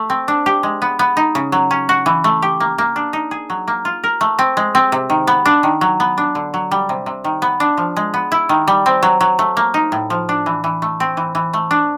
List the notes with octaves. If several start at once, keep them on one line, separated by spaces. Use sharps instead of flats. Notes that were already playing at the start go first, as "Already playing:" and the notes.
Already playing: A3
C4
D4
G4
G#3
B3
B3
D#4
C#3
F#3
C#4
F#4
E3
A3
G4
A#3
A#3
D4
D#4
G#4
F#3
A#3
F4
A#4
A3
C4
G#3
C4
C3
D#3
B3
D4
D#3
F#3
B3
D4
D3
F#3
G3
C3
C3
D#3
B3
D4
F3
G#3
B3
E4
D#3
G3
C4
F#3
F#3
A3
A#3
D#4
A2
F3
D4
E3
E3
A3
C4
E3
E3
A3
D4